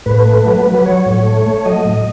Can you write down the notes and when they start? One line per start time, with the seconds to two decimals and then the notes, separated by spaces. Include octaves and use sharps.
0.06 A2 B4
0.26 A3
0.46 F#3
0.66 F#3
0.75 B4
0.85 F#3 C#5
1.06 A2
1.26 A3
1.46 A3
1.65 F#3 D#5
1.85 A2